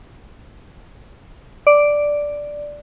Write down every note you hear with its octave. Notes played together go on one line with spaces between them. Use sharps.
D5